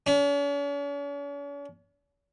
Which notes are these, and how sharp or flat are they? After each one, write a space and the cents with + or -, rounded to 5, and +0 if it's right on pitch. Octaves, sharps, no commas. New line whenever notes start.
C#4 +45